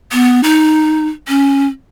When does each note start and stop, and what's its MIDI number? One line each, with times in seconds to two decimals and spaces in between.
0.12 0.41 59
0.44 1.07 63
1.28 1.66 61